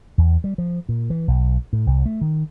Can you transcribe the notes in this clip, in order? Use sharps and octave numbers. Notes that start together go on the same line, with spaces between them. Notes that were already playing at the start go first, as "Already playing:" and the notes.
E2
G3
F3
A#2
E3
B1
A2
C2
A3
D#3